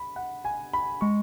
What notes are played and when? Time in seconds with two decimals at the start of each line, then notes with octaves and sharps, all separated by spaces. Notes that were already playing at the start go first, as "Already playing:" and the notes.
Already playing: B5
0.16 F#5
0.45 G#5
0.73 B5
1.01 G#3 C#6